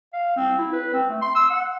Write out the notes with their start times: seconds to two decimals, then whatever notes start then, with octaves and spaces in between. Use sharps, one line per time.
0.13 F5
0.36 C4
0.58 E4
0.72 B4
0.93 C4
1.09 A3
1.21 C6
1.35 E6
1.50 F#5